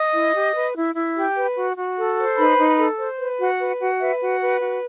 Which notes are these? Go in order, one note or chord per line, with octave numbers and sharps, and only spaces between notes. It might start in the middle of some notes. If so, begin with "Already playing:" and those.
Already playing: D#5 D#6
E4
G4
B4
E4
E4
G4
B4
F#4
F#4
A4
C5
D#4 B4 B5
D#4
A4
C5
B4
F#4
B4
F#4
B4 E5
F#4
B4
F#4